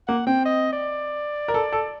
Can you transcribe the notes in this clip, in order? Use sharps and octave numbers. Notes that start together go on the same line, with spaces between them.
A#3 F#5
C4 G5
D#5
D5
A#4
A4
A4